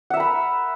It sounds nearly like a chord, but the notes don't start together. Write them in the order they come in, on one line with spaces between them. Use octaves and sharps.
F#5 E5 A#4 B5